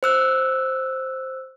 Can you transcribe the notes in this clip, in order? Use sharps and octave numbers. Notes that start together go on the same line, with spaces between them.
C5 E6 F#6